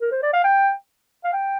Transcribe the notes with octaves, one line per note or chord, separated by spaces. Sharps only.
A#4
C5
D5
F5
G5
F5
G5